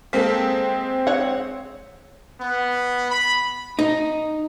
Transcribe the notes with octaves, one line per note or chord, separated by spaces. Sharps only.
G#3 A#3 C4 A4 B6
C#5 F#5
B3
B5
D#4